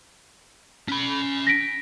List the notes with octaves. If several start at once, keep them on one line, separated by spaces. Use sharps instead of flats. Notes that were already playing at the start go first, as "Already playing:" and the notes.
C#4 B5
A#6 B6 D7